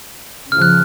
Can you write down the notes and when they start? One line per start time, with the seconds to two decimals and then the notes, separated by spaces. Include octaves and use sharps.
0.52 C#3 F3 F6
0.62 F#6